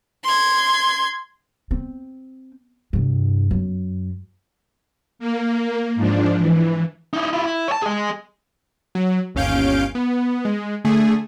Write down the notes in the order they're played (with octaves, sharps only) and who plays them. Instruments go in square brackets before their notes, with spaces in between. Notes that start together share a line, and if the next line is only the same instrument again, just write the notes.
[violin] C6 G#6
[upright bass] C4
G2 C3
F#2
[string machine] A#3
G#2 F3 D4
E3
[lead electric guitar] D#4 E4
E4 F4
E4
C#5 A5
G#4 D#5
[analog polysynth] F#3
G1 D#2 C#4 F5 G6 D7
B3
G#3
D3 A3 G#4